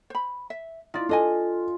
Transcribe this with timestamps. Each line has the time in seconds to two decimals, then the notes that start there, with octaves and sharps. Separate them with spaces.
0.10 C5 B5
0.50 E5
0.94 D#4 F4 D5
1.09 D4 A4 D#5 G#5